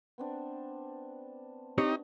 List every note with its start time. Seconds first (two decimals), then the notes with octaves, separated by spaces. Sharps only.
0.18 B3 C4 D4
1.78 C4 D4 D#4 G4 C#5